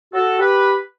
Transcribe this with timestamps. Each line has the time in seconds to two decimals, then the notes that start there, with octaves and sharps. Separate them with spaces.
0.13 F#4 A4
0.39 G4 B4